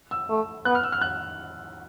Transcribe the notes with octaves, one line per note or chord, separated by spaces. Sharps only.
E6
A3
B3 F#6
F6
E6
F6
F#6